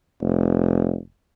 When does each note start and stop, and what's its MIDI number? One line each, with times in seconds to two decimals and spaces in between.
0.22 0.97 29